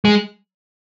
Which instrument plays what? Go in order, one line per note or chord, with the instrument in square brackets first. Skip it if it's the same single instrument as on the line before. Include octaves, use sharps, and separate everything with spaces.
[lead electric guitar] G#3